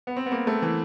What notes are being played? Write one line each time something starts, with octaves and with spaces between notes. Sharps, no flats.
B3
C4
B3
A#3
A3
E3